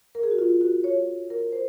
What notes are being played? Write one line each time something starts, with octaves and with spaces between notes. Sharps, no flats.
A#4
G#4
F#4
F4
F#4
C#5
A#4
C5